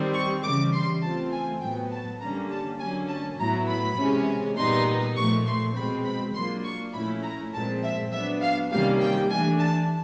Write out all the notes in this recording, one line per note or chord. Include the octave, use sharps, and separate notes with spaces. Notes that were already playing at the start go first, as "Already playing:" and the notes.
Already playing: D#3 G3 C4
C#6
C#3 E3 G3 D6
C6
E3 A3 C4 F4 A5
G#5
A2 F#3 B3 G5
A5
D3 G3 A#3 C#4 A#5
A5
D3 F#3 A#3 C#4 G#5
A5
A2 F#3 B3 E4 A#5
B5
C3 E3 G#3 C#4
A#2 G3 B3 D#4 C6
A#2 F3 A3 C#6
C6
B2 G#3 C4 B5
B5
F#3 A#3 D4 F4 C6
C#6
A#2 F3 A3 C#4 E4 B5
A#5
A#2 F3 G#3 C4 A5
E5
F#3 B3 D4 E5
F5
C3 D#3 G3 A#3 C#4 F5
G5
E3 A3 D4 G#5
A5